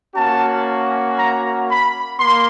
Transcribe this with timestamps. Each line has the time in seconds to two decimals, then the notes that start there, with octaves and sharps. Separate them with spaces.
0.15 A#3 C#4 F#4 A5
1.17 A#5
1.68 B5
2.19 A#3 C6